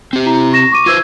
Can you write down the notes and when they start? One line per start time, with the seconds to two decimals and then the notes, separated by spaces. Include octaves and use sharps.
0.13 C4 G4
0.25 E4 A#5
0.53 C#6 A#6 E7
0.72 C#6 D6 D#7
0.86 F4 B4 C5 E6 G#6 D#7